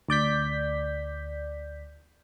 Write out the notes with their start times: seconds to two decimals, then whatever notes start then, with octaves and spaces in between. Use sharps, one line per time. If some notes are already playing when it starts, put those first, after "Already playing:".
0.09 D2 D5 G6 B6